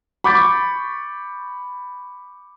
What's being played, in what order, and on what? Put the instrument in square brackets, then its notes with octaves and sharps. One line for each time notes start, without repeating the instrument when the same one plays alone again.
[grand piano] B5 C#6 D6 G6 A6 B6